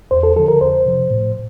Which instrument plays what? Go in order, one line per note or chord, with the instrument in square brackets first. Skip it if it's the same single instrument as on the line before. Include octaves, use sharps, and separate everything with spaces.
[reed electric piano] E2 C5
A4
D3 F3 A4
A#4
F2 C5
C3 F3
A2